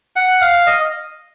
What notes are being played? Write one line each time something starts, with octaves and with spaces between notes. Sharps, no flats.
F#5
F5
D#5